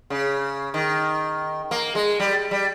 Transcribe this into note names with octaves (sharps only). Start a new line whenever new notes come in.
C#3
D#3
A#3
G#3
G3
G3